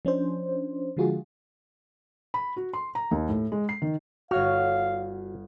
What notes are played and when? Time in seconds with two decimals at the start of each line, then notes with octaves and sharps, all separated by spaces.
0.05 F3 C#4 D4 C5
0.97 D3 F3 G#3 F4 F#4 G#4
2.34 B5
2.56 F#4
2.73 C6
2.95 A#5
3.11 D#2
3.29 A2
3.52 G#3
3.69 C7
3.82 D#3
4.31 G1 F#4 C#5 F5 F6